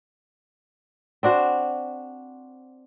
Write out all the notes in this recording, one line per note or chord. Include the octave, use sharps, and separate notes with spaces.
C4 D4 F#4 C5